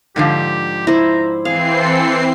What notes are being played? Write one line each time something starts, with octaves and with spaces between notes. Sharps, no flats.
G#2 D3 F3 G4
E4 C5 A#5
E3 C4 G#4 F5 C7
A4